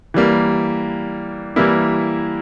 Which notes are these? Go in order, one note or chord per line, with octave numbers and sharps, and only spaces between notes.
E3 G3 A#3
E3 G3 A#3 E4